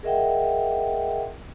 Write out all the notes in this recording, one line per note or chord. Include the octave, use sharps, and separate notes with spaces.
G#4 A#4 D#5 E5 F#5 G5